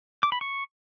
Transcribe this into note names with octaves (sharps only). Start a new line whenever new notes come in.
D6
B5
C#6